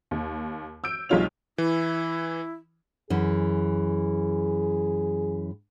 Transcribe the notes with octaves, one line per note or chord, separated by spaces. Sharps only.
D#2
E6 G6 D7
B1 G3 G#3 F4 C#5 F7
E3 E4
F#2 E3 G#4